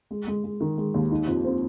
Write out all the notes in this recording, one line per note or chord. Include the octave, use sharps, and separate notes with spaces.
G#3
G#3
G#3
D#3
G#3
D#2
D#4
F2
C4